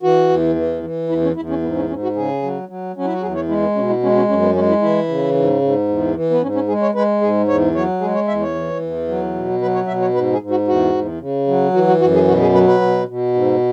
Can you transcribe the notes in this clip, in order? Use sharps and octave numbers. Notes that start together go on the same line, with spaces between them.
E3 F#4
E2
E3
E3
E2 E4
C#4
E2 E4
C#4
G#2 B3
C#4
G#2 C#4
F#4
C#3 G#4
F#3
F#3
F#3 C#4
E4
F#4
E2 G#4
C#5
G#3 E4
B3
B2 C#4
E4
G#3 C#4
C#4
F#2 C#4
B3
G#3 C#4
E4
E3 E4
C#3
G#2
G#2
E2
E3
B3
G#2 C#4
C#4
G#3 G#4
C#5
G#3 B4
G#2 G#4
E2 C#5
F#3 C#5
G#3 G#4
C#5
E2 E5
C#5
E3
E2
F#3
B2
F#3 B4
C#5
B2 E5
C#5
G#2 B4
G#4
G#2
F#4
E2 F#4
E2
C#3
F#3
E3 F#4
F#4
F#2 F#4
G#4
B2 F#4
G#4
F#3 B4
B4
B2
B2
G#2